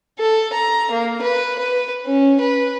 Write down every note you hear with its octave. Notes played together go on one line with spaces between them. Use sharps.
A4
A#5
A#3
B4
B4
C#4
B4